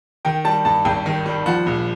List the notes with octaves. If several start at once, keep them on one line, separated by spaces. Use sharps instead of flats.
D#3 G5
G3 A5
G2 A5
G#1 G5
D#3
G3
F3 F#5
A#1